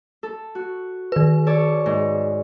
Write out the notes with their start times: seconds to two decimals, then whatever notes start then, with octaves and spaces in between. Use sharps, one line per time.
0.23 A4
0.55 F#4
1.12 D#3 B4
1.47 A4 C#5 D5
1.86 G#2